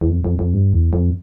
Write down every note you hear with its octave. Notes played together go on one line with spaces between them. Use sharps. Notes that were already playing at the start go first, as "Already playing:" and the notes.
E2
F2
F2
F2
G2
E2
F2